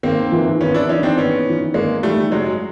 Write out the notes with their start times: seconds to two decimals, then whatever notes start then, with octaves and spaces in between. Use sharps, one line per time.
0.03 G#1 A#3 C4
0.32 G#2 E3
0.61 G#1 B3 C#4
0.74 D4 E4
0.89 G#2 E3 C#4 D#4
1.03 C4 D4
1.17 G#1 B3 C#4
1.46 G#2 E3
1.74 G#1 G#3 A#3
2.03 G#2 E3 G3 A3
2.32 F#1 F#3 G#3